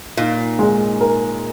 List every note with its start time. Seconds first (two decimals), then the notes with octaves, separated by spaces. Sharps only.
0.17 A#2 D#4
0.59 G#3
1.01 A#4